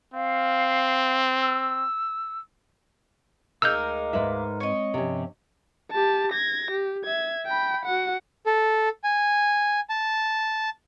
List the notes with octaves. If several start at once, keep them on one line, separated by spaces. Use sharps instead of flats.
C4 F5
E6
D2 G#3 D#4 A#4 F5 D6 E6 G6
G#2 B4 E5
G#3 C4 C#5 D#5
G2 C3 F3 C#4
G4 A5
G#6 A#6
G4
E5 G#6
G5 B5
F#4 F#5
A4
G#5
A5